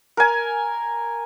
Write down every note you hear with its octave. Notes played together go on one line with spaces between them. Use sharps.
A#4 G#5